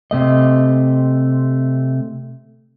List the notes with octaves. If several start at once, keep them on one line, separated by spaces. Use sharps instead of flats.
C3 A3 D#5